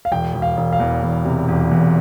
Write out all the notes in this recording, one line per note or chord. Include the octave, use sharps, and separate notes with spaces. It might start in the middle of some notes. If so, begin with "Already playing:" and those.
F5
E1 G5
E1
F5
E1
F5
E2
E2
C3
E1
E2